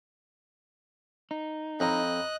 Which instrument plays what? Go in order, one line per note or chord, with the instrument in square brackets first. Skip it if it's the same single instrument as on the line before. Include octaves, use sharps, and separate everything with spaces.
[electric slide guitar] D#4
[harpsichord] F2 [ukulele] C#5 A#5 B5 [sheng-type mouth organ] D#5 F#6